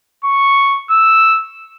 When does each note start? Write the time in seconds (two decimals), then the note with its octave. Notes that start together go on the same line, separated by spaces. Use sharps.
0.25 C#6
0.91 E6